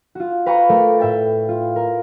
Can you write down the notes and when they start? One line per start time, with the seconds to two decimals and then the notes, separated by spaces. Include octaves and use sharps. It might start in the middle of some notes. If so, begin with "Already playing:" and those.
0.15 F4 F#4
0.46 B4 F5 G5 A#5 B5 C#6
0.69 A3 A#4 D5
0.99 A2 E5 G5 A6
1.48 F4
1.76 A#4